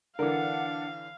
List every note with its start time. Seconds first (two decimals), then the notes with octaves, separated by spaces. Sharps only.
0.19 D3 E3 D4 A#4 F5 F#5